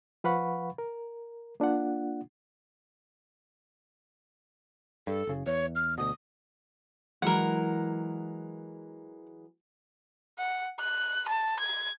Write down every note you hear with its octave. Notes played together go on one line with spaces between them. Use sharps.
F3 B4 F5 F#5 B5 C#6
A#4
A#3 D4 F4 F#5
G2 A4
F#1 C#3
E2 C#5
F6
D2 B2 D#6
E3 F#3 G#3 A#4 F#5
F#5
F#6
A5
G#6